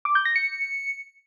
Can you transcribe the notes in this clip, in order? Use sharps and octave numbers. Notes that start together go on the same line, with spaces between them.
D6
G6
A#6
C#7